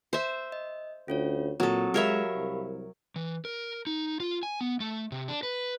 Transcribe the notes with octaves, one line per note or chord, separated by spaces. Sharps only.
C5 E5
D#5
D2 C#4 F4 C#5
A#2 F#3 C4 A4 D#6
G#3 G4 A#4 C#5 E5 F5 B5
C2
E3
A#4
D#4
F4
G#5
B3
A3
C3
D4
B4